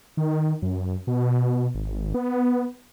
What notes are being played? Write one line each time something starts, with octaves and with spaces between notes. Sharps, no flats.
D#3
F#2
B2
G#1
B3